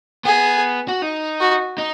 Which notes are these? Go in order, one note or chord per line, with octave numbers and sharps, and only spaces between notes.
B3 G#4
F#4
D#4
F#4
D#4